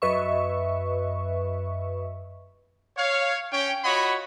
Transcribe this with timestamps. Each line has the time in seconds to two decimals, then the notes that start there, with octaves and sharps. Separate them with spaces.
0.02 F#2 B4 D#5 E5 C#6
2.97 C#5 F5
3.51 C#4 C#5 G5
3.84 F4 F#4 C#5 D#5 F#5 B5